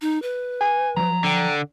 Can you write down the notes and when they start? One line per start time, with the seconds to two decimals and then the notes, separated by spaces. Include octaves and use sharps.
0.02 D#4
0.22 B4
0.61 G#5
0.97 F3 F#3 A#5
1.24 D3 G5